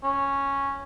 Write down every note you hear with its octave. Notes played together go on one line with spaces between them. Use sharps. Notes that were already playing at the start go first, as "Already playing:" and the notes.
C#4